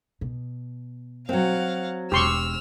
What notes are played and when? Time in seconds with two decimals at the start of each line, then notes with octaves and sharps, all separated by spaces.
0.21 B2
1.29 F#3 C4 F5 F#5
2.12 E1 G4 C6 C#6 E6 F6